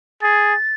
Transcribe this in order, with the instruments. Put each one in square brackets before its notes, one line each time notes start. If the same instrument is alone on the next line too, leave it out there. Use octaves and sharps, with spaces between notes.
[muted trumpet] G#4 [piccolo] A6